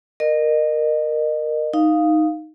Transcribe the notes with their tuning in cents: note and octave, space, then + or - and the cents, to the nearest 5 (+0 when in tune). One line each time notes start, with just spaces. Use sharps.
A#4 +0 D#5 -30
D#4 +0 F5 +0